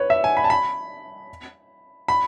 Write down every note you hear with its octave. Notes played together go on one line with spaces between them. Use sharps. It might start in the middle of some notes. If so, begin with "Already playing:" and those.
Already playing: B4 C#5
E5
G#5
B5
A5
B5
B5